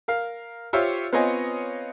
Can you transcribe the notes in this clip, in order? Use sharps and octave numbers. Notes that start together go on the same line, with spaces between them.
A#4 F5
F4 G4 C5 C#5 E5 F5
B3 C4 F4 C#5 D#5 G#5